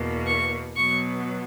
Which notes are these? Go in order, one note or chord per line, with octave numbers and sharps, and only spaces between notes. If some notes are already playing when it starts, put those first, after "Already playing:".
Already playing: E2 B2 A#3
C#6
B2 F#3 B3 C#6